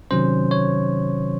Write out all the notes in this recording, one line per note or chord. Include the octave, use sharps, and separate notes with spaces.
C3 D#3 F#3 C#4 C5
C#5